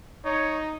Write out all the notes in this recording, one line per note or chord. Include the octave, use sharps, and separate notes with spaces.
D#4 C#5